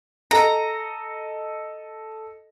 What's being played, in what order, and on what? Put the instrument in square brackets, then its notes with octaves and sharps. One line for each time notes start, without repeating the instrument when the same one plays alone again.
[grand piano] A4 D#5 [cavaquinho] A#5